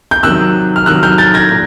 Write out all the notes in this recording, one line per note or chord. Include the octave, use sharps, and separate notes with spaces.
G6
C3 D#3 F#3 E6 F#6
F6
C3 D#3 F#3 E6 F#6
F6 G6
G6 A6
G#6 A#6
A#2